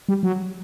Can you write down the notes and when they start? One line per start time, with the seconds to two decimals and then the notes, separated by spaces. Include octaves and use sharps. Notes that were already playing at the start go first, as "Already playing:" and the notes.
0.09 G3
0.23 F#3